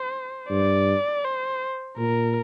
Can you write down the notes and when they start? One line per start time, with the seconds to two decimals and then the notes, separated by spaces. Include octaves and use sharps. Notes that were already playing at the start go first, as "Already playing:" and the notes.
Already playing: C5
0.50 G2 D5
1.25 C5
1.97 A#2 A#4